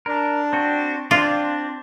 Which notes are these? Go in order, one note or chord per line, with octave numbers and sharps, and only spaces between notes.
D4 A#4
C4 F#4
C4 D4 F4 D5